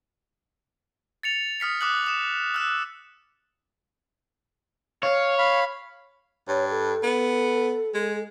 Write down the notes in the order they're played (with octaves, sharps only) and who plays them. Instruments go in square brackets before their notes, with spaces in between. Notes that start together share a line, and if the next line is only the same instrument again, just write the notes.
[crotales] A6 C#7 F7
D#6 F6 B6 C#7
D6 D#6 F#6 F#7
D#6 E7
E6 F#6 E7
[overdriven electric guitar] C#5 [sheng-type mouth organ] F5
[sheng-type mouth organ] F5 B5
[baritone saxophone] G2 [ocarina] C#5
[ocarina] A4
[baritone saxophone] B3
G#3